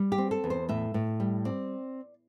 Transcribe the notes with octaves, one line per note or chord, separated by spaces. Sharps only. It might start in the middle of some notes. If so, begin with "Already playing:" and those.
Already playing: G3
G4
C4
A4
E2
C5
A2 E5
A2
G3
C4 D5